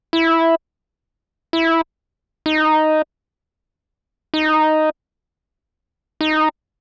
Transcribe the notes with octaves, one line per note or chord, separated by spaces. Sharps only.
E4
E4
D#4
D#4
D#4